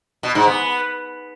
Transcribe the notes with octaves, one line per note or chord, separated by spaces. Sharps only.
B2
G#2
B3